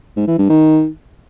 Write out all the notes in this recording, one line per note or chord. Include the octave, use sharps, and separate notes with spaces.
G#2
E3
G2
D#3